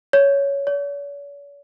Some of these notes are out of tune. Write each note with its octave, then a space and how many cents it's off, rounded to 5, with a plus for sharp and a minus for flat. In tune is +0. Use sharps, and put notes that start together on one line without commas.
C#5 +10
C#5 +45